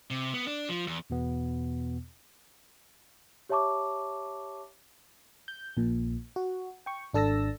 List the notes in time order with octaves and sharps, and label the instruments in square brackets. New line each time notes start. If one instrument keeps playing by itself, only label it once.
[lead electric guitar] C3
B3
D4
F3
E2
[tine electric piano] E2 B2 B3
[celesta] G4 C#5 E5 A5 C#6 D6
[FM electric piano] G6
A#1 A#2
F#4
G5 C#6
G#1 D4 A4 A5 E6 A#6